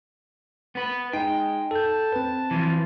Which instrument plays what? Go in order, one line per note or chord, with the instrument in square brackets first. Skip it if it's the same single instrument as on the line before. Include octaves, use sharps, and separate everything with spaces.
[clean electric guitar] B3 B4
[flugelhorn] G#3 [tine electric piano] D#4 [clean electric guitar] G5
[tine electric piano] A4 G6 [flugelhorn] A5
[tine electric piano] C4 B4
[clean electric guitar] E3 F3